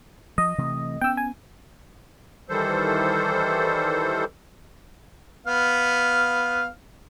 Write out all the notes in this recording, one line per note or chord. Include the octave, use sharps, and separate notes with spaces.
F3 D#5
C3 E3 A3
B3 C#4 G5 E6
G#5
D#3 E3 G3 A4 C5
B3 F5